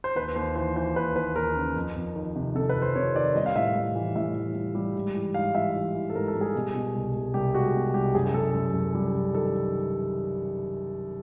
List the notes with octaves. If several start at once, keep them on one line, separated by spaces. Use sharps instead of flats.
C5
D#2 B4
D#2 C5
E3 C5
E3 C5
D#2 B4
D#2 B4
D#2 A#4
C#3
F2
F2
D#3
C3
C3 A4
B4
F2
C5
C3 C#5
D#3 D5
G3 D#5
F5
A2 E5
A2
E3
A2 E5
E3
G3
G3
G#2
E3
G#2 F5
E3 E5
E3
E3
A4
G#2 A#4
A4
G3
G#4
B2
B2
C2
C2
C2 G4
G#3 F#4
B2
C2 G4
F#2 G#4
G3 A4
F#2
F#2
G3
F#2
D#3 A4